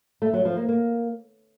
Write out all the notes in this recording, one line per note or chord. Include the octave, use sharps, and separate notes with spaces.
A3
F#3
F3
A#3
A#3